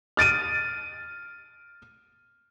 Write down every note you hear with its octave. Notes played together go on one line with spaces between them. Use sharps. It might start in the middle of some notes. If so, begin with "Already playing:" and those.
F6 A6 D7 D#7